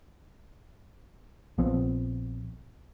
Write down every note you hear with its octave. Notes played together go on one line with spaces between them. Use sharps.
A#1 F3 B3 C4